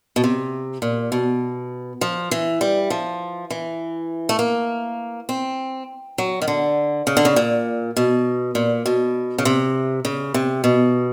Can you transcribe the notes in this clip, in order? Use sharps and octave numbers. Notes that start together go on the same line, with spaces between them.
B2
C3
A#2
B2
F3
E3
G3
F3
E3
A3
A#3
C4
F#3
D#3
D3
C#3
D3
C#3
A#2
B2
A#2
B2
C#3
C3
C#3
C3
B2